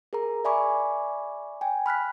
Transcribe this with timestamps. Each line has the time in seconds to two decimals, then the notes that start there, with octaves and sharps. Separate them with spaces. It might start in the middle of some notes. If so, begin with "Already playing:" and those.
0.13 G#4 A#4 A#5
0.45 D5 E5 G#5 B5 C#6 D6
1.61 G5 G#5
1.86 B5 F6 F#6 B6